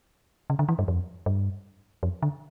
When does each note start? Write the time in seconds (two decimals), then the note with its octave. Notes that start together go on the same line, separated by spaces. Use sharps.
0.50 C#3
0.59 D3
0.69 E3
0.79 G2
0.88 F2
1.26 G2
2.03 F2
2.23 D3